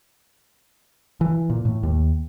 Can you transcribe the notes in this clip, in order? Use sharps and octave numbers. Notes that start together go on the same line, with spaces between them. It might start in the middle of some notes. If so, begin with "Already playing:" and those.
E3
A#2
A2
D#2